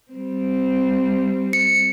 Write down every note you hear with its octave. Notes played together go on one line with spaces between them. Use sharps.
G3 C4
C#7